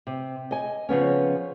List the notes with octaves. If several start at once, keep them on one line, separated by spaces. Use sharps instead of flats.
C3
D#5 G#5
C#3 F3 B3 C#4